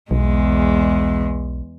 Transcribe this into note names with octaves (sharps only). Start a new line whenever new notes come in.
B1 E2 G#3